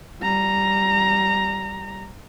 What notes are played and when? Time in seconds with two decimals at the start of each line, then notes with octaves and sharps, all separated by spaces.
0.21 G3 A#5